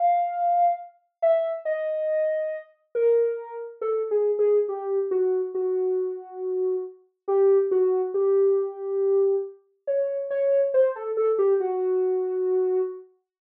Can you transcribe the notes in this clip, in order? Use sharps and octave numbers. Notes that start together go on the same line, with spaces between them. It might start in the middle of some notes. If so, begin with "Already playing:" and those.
Already playing: F5
E5
D#5
A#4
A4
G#4
G#4
G4
F#4
F#4
G4
F#4
G4
C#5
C#5
C5
A4
A4
G4
F#4